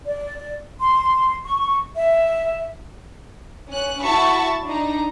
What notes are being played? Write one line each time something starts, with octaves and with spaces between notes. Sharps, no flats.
D5
C6
C#6
E5
C#4 F#6
E4 F#4 A5 B5 C#6
D4 D#4 A#5